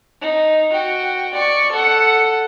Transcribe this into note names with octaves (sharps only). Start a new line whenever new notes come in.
D#4
F#4 G5
D5 C#6
A4 F#5